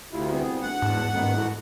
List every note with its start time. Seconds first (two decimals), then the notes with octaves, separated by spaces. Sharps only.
0.12 D2 C3 E4 F4
0.32 C2 B3 C4 G#4
0.62 D2 F#5
0.82 E2 G#2 A5
1.13 D#1 D#3 B3
1.37 E3 A3 F#4